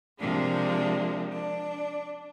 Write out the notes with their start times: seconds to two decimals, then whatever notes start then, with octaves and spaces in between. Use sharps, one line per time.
0.19 C3 F3 G#3 A#3 D4
1.31 D4